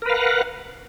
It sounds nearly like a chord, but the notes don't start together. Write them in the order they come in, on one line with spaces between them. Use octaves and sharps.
A#4 B4 F5 F#5